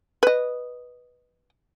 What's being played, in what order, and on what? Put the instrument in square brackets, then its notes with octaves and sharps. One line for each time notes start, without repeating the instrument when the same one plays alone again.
[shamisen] B4 D#5